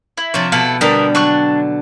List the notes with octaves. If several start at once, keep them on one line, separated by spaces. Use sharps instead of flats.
E4
C3 F3 D4 C#5
B2 E4 A4 F5
D3 G3 B3 A4 A#4
F#3 D4 C#6 F#6